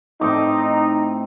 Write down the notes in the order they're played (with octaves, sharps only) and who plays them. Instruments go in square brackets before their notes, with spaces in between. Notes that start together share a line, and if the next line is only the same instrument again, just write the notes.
[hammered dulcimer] A2 C4 D6 [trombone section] D#4